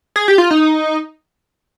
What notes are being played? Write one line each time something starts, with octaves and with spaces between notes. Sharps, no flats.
G#4
G4
F4
D#4